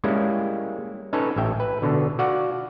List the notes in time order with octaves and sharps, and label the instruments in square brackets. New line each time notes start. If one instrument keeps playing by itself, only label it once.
[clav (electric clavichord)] G3 G#3 A#3 C#4 E4
C#4 D#4 A4 B4 C#5
A1 E5 G5
B4
B2 D3
F#4 D5 F5 F#5